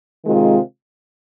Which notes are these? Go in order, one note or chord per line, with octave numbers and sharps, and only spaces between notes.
C3 D#3 G#3 C4 F4